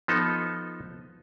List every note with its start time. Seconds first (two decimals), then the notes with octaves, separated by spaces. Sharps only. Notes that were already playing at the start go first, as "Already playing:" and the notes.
0.08 F3 B3 D#4 A4